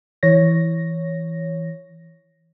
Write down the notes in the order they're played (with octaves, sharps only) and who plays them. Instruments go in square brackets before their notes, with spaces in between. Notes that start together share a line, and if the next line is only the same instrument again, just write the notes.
[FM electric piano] E3 C#5 A#6